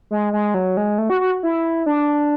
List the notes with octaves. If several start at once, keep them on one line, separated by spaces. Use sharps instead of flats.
G#3
G#3
F#3
G#3
A3
F#4
F#4
E4
D4